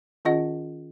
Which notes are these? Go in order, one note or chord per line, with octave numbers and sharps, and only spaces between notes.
D#3 C#4 F4 G#4 D#5 F#5